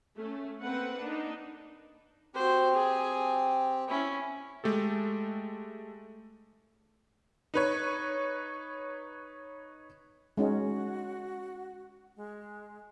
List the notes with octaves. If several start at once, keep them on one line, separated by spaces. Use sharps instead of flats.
A3 C#4
A#3 C4 A4 B4 F#5
A#3 D4 D#4
C4 F#4 G4 C5
G#4
C#4 E4
G#3 A3 G4 A4
D#4 B4 C#5
G#3 C#4 D#4 F#4
G#3